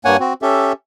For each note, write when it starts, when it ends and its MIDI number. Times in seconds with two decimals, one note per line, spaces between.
0.05 0.17 43
0.05 0.17 58
0.05 0.17 73
0.05 0.17 78
0.05 0.17 80
0.20 0.34 60
0.20 0.34 66
0.42 0.73 61
0.42 0.73 67
0.42 0.73 69
0.42 0.73 76